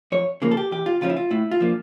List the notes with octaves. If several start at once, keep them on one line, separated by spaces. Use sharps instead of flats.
F2 C#5
C#3 F3 A#3
A4
G4
E2 G4
F4
C#3 F3 C#4 F4
E4
F4
A2 E4
F4
F3 A#3 D4